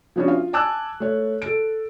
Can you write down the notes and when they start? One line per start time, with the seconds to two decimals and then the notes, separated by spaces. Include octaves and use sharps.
0.16 F3 B3 C#4 D4 F#4
0.28 F4
0.53 G#5 A5 D6 E6 F#6
1.00 A3 C#5
1.42 A4 D7